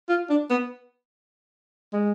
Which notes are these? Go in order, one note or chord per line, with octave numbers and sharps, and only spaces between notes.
F4
D4
B3
G#3